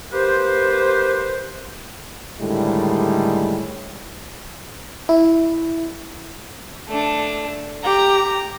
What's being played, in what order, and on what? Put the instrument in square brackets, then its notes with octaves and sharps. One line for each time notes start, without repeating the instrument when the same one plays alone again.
[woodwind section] A#3 G4 B4 C5
[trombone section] A2 D3 D#3 G3 G#3
[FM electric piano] E4
[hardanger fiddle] A3 D4
[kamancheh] G4 [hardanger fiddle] A#5